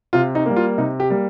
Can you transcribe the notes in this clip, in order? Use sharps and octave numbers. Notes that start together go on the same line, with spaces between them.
C3 F4
D#4
G3 A#3
F4
C3 D#4
G4
G3 A#3